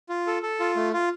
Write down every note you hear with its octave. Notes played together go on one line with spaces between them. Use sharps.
F4
A4
A4
F4
A3
F4